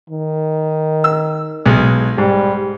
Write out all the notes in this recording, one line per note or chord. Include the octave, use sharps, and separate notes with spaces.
D#3
E6
B1 G#3
G#2 G3